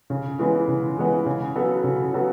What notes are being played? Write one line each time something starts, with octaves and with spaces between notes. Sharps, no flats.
C#3
E3 G#3 B3
C#3
E3 G#3 B3
C#3
F#3 B3 F#4 A4
C#3
F#3 B3 F#4 A4